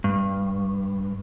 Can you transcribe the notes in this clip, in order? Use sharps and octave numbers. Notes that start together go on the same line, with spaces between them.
G2